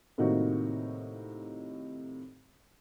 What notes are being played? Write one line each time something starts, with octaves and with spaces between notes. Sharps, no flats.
A2 C3 D#3 A#3 D#4 F#4